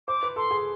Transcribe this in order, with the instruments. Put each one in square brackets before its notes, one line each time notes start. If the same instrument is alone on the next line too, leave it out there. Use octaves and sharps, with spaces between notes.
[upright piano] C5 [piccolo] D6
[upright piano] B4
[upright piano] A4 [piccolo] C6
[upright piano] G#4